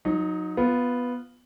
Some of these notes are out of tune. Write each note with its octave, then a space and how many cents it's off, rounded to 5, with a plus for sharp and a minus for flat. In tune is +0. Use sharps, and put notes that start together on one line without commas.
F#3 -30 D#4 +0
B3 +0 F4 +0